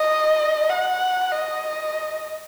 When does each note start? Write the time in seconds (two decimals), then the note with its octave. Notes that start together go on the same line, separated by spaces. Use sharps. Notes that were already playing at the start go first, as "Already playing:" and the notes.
Already playing: D#5
0.70 F#5
1.32 D#5